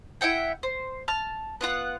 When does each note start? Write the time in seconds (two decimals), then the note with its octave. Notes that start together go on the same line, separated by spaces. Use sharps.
0.21 E4 E5 F#5 G5
0.63 C5
1.08 A5 F6
1.61 B3 F4 F#5